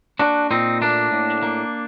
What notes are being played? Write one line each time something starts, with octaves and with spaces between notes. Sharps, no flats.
A#3 D4 F#4
A#2 C4 D#4
A3 A#3 D4
A2
A#3